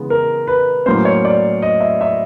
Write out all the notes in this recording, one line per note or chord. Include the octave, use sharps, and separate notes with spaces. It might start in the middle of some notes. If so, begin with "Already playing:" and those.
Already playing: C#3 E3 G#3 B3
A#4
B4
A2 F#3 A#3 C#4 C5
C#5
D5
D#5
E5
E5